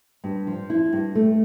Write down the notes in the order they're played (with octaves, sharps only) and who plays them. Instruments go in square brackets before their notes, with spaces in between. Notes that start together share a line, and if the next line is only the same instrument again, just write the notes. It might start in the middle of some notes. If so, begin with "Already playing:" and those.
[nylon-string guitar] G2
F3
E4
G2
A3